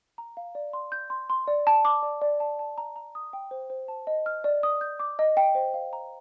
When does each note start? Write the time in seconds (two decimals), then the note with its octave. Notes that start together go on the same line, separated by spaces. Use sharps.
0.18 A#5
0.37 F5
0.55 D5
0.73 C6
0.92 G6
1.10 C6
1.30 C6
1.48 D5
1.67 A5
1.85 D6
2.03 D5
2.22 D5
2.40 A5
2.59 A5
2.78 A#5
2.96 A#5
3.15 D#6
3.33 G5
3.51 C5
3.70 C5
3.88 A5
4.07 D#5
4.26 F6
4.44 D5
4.63 D#6
4.81 G6
5.00 D6
5.19 D#5
5.37 G5
5.55 C5
5.74 F5
5.93 A#5